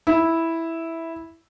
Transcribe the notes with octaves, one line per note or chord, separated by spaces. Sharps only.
E4